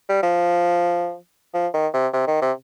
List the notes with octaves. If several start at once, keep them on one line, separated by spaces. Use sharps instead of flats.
G3
F3
F3
D#3
C3
C3
D#3
C3